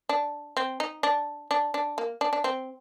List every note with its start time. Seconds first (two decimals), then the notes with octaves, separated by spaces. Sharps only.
0.09 D4
0.57 C4
0.80 D#4
1.03 D4
1.51 D4
1.74 D4
1.98 A#3
2.21 D4
2.33 D4
2.44 C4